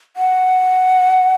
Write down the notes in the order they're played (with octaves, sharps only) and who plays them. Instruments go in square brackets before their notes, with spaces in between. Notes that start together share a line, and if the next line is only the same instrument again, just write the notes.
[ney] F#5